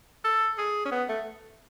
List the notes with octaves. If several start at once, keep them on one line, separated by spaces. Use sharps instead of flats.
A4
G#4
C#4
B3
A3